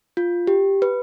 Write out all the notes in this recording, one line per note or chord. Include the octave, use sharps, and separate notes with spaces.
F4
G4
B4